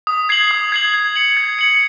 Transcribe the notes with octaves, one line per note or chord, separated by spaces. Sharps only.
D#6
G#6 C7 F#7
D#6
G#6 C7 F#7
G#6
C#7 F#7
G#6
C#7 F#7